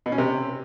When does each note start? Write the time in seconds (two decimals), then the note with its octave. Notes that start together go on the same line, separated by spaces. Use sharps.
0.06 B2
0.12 C#4
0.18 C3